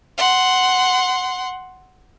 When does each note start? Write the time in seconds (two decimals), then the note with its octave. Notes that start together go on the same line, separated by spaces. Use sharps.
0.18 F#5 C6